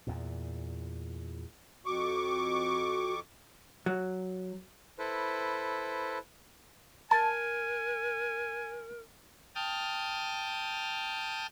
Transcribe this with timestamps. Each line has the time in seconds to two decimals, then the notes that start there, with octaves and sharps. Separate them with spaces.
0.07 E2 A#2
1.86 F2 F#4 C#6 D6
3.86 F#3
4.99 E4 A4 B4 C5
7.11 A#4 G#5 A5
9.55 G5 A5 D#6 F6